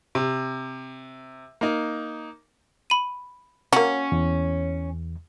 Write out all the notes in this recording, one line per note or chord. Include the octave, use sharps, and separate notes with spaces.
C3
A#3 D#4
B5 D#7
A#3 C#4 F#4
E2